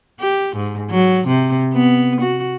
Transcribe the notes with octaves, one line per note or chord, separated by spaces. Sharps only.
G4
G#2
F#3
C3
B3
F#4